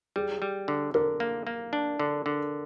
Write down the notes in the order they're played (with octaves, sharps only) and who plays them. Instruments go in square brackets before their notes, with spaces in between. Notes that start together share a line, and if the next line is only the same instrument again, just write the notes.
[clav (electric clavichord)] G3 [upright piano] G#4
[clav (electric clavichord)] G3
D3
[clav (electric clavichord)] D3 [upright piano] A#4
[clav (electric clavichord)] A#3
A#3
D4
D3
D3